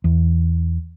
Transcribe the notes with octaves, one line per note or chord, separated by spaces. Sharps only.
E2